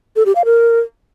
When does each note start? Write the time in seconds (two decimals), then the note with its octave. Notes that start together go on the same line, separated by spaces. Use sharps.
0.16 A4
0.26 G4
0.35 F5
0.45 A#4